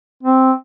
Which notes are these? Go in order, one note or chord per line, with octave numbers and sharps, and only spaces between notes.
C4